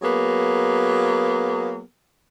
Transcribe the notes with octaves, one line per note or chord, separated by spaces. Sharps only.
F#3 A#3 B3 G#4